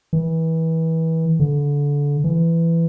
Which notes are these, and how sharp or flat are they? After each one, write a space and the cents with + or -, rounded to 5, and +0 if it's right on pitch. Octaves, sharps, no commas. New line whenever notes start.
E3 -25
D3 -25
E3 +15